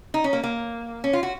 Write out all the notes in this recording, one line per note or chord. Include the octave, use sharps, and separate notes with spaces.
D#4
C#4
A#3
A#3
C#4
F4
F#4